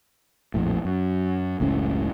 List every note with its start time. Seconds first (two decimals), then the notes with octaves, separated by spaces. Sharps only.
0.54 A#1 F2 A2
0.85 F#2
1.60 F#1 C#2 A2 C#4